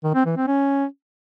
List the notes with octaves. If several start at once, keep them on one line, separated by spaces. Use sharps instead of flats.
D#3
C4
E3
C4
C#4